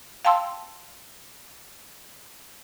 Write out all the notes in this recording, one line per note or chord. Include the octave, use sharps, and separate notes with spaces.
F5 G5 A5 C6 E6